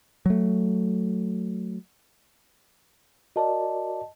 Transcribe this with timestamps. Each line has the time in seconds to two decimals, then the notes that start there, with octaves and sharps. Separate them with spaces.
0.26 F#3 A3
3.36 F#4 A#4 D5 D#5 A5